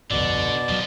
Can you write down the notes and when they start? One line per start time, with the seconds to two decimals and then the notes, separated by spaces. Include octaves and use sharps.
0.10 G1 C2 F2 B2 D3 D5
0.69 D#1 C#2 F3 F#3